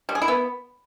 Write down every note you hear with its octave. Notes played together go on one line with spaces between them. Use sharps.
G3
G#4
E4
B3